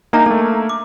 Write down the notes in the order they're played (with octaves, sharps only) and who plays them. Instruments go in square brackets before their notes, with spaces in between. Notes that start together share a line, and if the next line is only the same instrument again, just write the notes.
[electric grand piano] A#3 D#4 [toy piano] D4 E5 A#5
[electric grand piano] A3 A#3 [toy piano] A4
[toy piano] D6